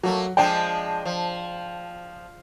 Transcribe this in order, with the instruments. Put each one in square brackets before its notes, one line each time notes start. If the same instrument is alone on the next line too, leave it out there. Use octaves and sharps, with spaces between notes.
[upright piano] F#3 [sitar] A3 A#3
[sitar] F3 G#3 D4 [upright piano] G5
[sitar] F3